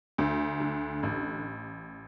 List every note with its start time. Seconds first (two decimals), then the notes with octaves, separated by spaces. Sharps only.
0.18 D2
0.60 D3
1.03 A1